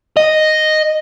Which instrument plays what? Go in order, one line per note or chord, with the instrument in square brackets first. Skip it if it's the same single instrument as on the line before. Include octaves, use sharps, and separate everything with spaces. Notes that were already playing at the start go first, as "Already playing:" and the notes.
[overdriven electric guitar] D#5